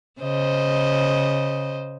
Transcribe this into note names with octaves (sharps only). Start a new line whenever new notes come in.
C#3 C5 D#5